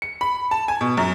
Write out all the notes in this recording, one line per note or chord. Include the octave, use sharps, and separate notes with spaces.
C#7
B5
A5
G#5
B2
F#2